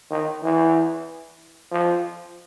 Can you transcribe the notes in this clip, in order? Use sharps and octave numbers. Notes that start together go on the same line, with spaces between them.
D#3
E3
F3